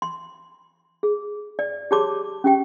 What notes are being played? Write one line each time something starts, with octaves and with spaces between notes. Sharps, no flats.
C6
G#4
D5
G4 G#4 C#5 A5 C6 D6
C#4 G4 G5